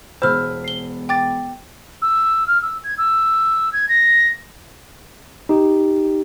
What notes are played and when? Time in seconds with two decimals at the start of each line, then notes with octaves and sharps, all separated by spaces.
0.22 E1 C5 B5 E6 F6
0.64 C7 G7
1.09 G5 D6 A6
2.02 E6
2.47 F6
2.62 E6
2.84 G#6
2.98 E6
3.73 G#6
3.89 A#6
5.49 D#4 G4